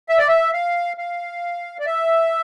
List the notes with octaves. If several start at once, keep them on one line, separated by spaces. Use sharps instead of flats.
E5
D5
E5
F5
F5
D5
E5